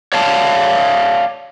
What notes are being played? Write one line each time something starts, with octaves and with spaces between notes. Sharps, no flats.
C#5 D5 F5 A5